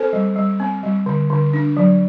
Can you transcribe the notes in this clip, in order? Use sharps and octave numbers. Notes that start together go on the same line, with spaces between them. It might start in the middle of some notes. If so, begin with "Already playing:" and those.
Already playing: C4 A4 C5
G3
G3
C4
G3
D3
D3
D4
F#3